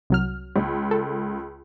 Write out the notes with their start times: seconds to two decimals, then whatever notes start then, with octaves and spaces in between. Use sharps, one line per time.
0.10 C2 F#3 F6
0.56 C#2
0.91 A4